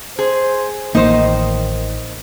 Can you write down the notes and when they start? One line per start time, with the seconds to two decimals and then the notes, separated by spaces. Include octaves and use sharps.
0.19 G#4 C5
0.95 A1 D#3 A#3 D#4 C5